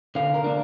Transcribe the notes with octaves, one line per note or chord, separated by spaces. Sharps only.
D3 F5
A#4
A#3 D4